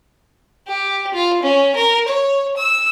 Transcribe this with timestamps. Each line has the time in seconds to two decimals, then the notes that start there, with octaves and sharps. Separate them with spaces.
0.67 G4
1.14 F4
1.42 C#4
1.76 A#4
2.08 C#5
2.57 E6